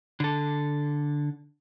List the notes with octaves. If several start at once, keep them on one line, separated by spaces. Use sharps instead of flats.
D3 A4